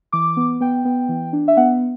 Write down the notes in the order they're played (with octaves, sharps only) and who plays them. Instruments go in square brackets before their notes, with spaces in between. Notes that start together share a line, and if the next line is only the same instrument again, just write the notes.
[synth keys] E3 D6
B3
B3 G5
B3
E3
D4
E5
B3 F#5